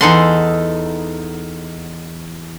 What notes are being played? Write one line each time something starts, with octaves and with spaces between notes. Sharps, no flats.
E2 D#4 A4 F#5 C6